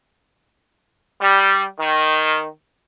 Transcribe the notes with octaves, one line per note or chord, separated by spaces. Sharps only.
G3
D#3